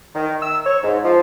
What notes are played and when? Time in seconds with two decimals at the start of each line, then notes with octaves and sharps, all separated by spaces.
0.15 D#3
0.42 E6
0.66 C#5
0.83 G#2
1.04 F3